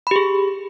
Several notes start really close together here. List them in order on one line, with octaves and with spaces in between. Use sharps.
B5 G4 G#4